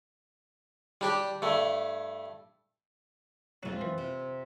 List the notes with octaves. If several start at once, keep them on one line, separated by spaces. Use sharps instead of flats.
G3 D4 G4
G2 A3
G#2 F#3 C4 F4 B4
E3
C3